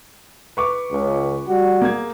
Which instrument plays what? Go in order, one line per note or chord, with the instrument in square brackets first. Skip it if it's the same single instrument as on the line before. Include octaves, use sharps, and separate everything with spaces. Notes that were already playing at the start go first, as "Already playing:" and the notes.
[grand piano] B4 C#6 D6
[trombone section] C#2
G3 F#4
[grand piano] A#3 G#4 G#6